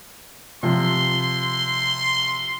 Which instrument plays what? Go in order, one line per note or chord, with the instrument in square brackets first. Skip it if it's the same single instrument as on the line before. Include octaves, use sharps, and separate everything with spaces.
[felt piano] C3 F3 [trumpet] C6